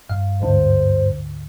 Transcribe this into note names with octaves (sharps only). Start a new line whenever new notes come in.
G2 F5
D2 G#2 D3 C5